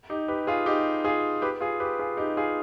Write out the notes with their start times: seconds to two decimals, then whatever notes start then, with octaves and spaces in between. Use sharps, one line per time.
0.10 D#4 G4
0.28 G4 B4
0.47 F4 G#4
0.66 D#4 G4
1.04 F4 G#4
1.42 G4 B4
1.61 F4 G#4
1.80 G4 B4
1.99 F4 G#4
2.17 D#4 G4
2.37 F4 G#4